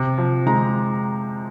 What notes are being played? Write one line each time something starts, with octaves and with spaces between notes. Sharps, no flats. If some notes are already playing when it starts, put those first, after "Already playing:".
Already playing: C3
F3
G#3 A#5